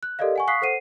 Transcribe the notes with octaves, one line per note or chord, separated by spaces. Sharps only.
F#6
G4 A4 A#4 D5 D#5 F5
F#5 G#5 C#6
F5 C#6 D#6 F#6 B6 C7
A4 C5 F#5 C7 D#7